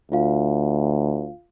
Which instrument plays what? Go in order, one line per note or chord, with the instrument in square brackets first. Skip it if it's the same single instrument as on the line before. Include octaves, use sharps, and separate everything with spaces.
[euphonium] D2 [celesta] F4 F5